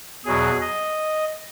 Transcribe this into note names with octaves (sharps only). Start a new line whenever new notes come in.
E2 B2 F#3 G#4
D#5